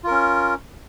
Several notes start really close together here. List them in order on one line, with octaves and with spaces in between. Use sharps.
F4 A#4 C#4